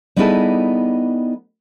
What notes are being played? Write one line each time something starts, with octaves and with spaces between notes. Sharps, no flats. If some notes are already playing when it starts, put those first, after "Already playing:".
G3 B3 D#4 E4 G#4 A4